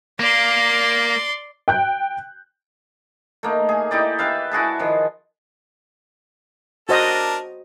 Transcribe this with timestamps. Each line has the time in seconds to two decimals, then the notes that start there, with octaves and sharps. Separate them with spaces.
0.20 A#3 D5 C6
1.68 G5 F#6 G6
3.43 A3 A#3 D#4
3.69 G#4
3.91 D#4 E4 G4 D5
4.19 G4 B4 E5 F5
4.51 E4 F#4 G#4 A5
4.79 D#3 F3
6.89 D4 F#4 A#4 C5 D#5